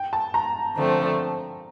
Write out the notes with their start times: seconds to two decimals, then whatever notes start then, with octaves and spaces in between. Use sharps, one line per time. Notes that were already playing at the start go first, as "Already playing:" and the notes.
Already playing: G5
0.13 A5
0.34 A#5
0.76 D3 F3 A3 C4